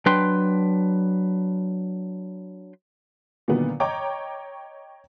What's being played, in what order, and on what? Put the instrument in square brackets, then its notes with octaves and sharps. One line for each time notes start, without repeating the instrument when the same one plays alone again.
[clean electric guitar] F#3 D4 B4 G5 C6
[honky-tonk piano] A#2 D3 D#3 F#3 B3
C#5 D#5 G5 A#5 C#6 D6